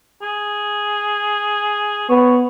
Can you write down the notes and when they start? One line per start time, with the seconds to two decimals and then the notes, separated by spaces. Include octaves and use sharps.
0.22 G#4
2.09 B3 C#5